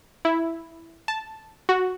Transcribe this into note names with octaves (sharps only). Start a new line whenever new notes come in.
E4
A5
F#4